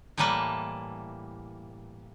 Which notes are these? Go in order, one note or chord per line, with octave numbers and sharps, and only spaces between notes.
A2 E3 G3 A#3 B4 A5